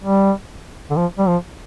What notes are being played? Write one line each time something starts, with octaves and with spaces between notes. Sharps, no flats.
G3
D3
F3
G3
F3